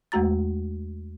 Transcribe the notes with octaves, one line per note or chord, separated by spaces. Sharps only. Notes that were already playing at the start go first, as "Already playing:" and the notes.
E2 G#3 A3 F#4 A#5 A6